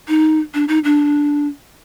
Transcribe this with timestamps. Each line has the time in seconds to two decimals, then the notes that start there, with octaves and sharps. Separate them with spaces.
0.08 D#4
0.54 D4
0.68 D#4
0.84 D4